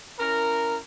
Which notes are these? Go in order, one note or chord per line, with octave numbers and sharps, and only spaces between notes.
C#4 E4 A#4